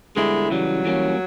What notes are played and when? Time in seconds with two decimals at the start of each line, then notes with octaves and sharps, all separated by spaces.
0.16 D3 G3 G#3 B3 E4
0.50 C#3 E3 F#3 G3
0.85 E3 G3 A#3 C#4